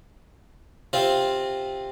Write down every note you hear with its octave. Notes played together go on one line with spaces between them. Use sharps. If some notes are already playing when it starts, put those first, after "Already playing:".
C3 C4 F4